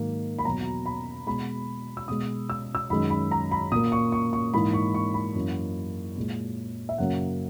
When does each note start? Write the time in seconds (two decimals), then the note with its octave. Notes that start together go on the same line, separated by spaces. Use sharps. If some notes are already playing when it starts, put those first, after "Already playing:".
Already playing: G#2 D#3 F#3 A#3
0.39 B5
0.45 E2 B2 F#3 A#5
0.86 B5
1.27 B2 G#3 B5
1.97 E6
2.08 B2 G#3 D#6
2.50 E6
2.75 E6
2.90 F#2 D#3 G#3 B5
3.10 B5
3.31 A#5
3.51 B5
3.72 A#2 A#3 D#6
3.92 C#6
4.12 C#6
4.33 C#6
4.54 G#2 E3 A#3 B5
4.74 C#6
4.94 C#6
5.14 B5
5.35 F#2 E3 A#3
6.17 A#2 G#3
6.89 E5
6.98 F#2 C#3 F#3 A#3 F#5